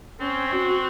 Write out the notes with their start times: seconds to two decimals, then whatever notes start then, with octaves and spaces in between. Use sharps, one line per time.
0.20 C4 C#4
0.52 F#4